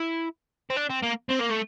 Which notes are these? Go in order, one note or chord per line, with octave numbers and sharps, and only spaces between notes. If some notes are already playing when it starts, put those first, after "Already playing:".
Already playing: E4
C4
D4
C4
A#3
C4
A#3
A3